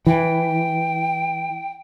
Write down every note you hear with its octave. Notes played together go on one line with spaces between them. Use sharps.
E3 G5